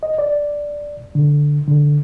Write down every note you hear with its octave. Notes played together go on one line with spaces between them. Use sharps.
D#5
D5
D3
D3